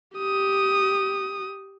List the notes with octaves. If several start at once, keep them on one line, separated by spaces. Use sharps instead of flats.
G4 D#6